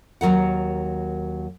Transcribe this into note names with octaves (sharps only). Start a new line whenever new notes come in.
D#2 F#3 A#4 F#5